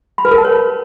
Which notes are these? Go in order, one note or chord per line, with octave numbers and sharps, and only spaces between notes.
B5
B4
A#4
A5
C#5